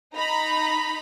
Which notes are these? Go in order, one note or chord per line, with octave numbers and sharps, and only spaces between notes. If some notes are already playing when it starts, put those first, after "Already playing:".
D#4 A#5 B5